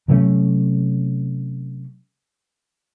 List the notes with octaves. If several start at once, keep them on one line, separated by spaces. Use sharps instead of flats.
C3 F#3 A3 C#4